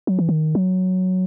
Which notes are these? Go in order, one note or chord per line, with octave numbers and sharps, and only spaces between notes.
F#3
E3
D#3
F#3